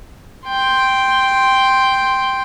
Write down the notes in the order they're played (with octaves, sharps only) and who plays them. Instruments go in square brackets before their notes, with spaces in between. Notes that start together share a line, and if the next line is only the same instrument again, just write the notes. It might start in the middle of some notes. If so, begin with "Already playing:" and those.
[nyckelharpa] G5 C6